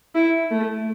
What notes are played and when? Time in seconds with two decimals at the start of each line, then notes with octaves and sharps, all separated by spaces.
0.15 E4
0.51 A3